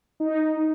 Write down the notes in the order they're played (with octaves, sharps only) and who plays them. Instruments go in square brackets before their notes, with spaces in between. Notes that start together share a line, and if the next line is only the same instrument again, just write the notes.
[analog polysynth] D#4